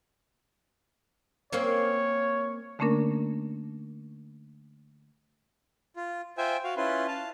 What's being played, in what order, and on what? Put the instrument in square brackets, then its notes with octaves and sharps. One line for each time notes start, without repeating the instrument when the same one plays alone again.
[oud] A#3 C4 C#4 [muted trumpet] C#5
[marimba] D3 A3 A#3 C#4 D4 A#4
[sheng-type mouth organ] F4
F4 C5 E5 G5 G#5
F#4 F5
C#4 E4 F4 B4 C6
F5 A5